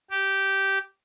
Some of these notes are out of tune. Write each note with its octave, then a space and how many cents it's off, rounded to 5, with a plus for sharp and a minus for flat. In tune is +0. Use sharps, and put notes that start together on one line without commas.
G4 -10